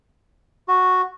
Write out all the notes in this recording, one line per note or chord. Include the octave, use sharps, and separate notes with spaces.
F#4